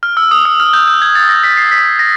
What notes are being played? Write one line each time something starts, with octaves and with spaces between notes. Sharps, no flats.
F6
E6
D#6
E6
F6
G6
G6
G#6
A6
A#6
B6
C7
B6
A#6